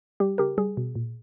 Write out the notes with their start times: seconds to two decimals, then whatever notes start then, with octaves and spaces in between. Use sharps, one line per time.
0.20 G3 G4
0.38 C#3 G4 A#4
0.58 G3 G#4
0.77 B2
0.95 A#2